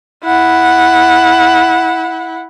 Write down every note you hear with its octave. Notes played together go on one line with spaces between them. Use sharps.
E4 F#5